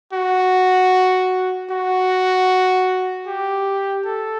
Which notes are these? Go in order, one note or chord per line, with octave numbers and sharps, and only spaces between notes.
F#4
F#4
G4
A4